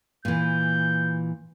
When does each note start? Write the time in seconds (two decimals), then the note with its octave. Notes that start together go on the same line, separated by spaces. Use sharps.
0.25 A#2 E3 G6